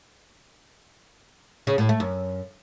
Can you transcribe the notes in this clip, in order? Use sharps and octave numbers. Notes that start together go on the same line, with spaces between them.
C#3
A2
A3
F#2